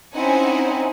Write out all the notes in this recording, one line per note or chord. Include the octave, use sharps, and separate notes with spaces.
C4 C#4 D#4 E4 F#5 G#5